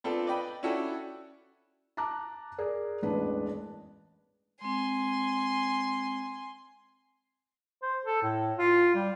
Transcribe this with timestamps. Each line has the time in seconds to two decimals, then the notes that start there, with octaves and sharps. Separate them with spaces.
0.04 B3 C4 D4 F4 A4
0.26 B4 D5 D#5 G5 B5
0.63 C#4 D4 E4 F#4 A4 G5
1.97 A5 A#5 D6 F#6
2.58 G#4 A#4 D5
3.02 E1 A1 D4 B4
4.61 G#3 C4 G#5 C6
7.82 C5
8.06 A4
8.23 A2
8.58 F4
8.95 G3